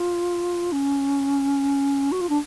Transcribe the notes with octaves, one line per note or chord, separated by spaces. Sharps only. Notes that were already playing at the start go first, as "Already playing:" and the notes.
Already playing: F4
C#4
F#4
F4
D4